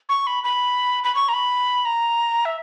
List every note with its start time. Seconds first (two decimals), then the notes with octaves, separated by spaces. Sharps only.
0.09 C#6
0.27 B5
0.44 B5
1.04 B5
1.15 C#6
1.29 A#5
1.33 B5
1.85 A#5
2.45 E5